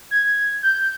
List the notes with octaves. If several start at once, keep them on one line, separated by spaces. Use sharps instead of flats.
G#6
G6